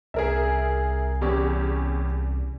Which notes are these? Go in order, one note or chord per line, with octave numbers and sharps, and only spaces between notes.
C2 G#4 A#4 E5
E2 C#4 G4